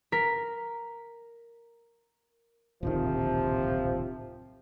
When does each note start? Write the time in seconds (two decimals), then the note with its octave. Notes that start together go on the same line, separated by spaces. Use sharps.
0.12 A#4 B6
2.83 D1 A#1 C3 D#3 F3